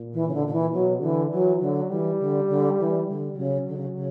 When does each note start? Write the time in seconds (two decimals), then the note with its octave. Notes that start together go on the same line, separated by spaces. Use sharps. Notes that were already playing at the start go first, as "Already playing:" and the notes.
Already playing: A#2
0.13 E3
0.28 C#3
0.33 D3
0.47 D3
0.52 E3
0.72 B2 F#3
1.01 D3 E3
1.30 E3 F#3
1.60 D3 F#3
1.90 E3 G3
2.19 D3
2.48 D3
2.79 E3
3.07 D3 G3
3.32 D3
3.37 C#3 F#3
3.67 D3
3.76 C#3
3.96 C#3